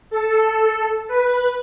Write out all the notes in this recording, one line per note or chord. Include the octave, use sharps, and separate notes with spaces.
A4
B4